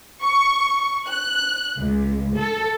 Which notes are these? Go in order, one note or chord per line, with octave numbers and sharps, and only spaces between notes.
C#6
F#6
C#2
A4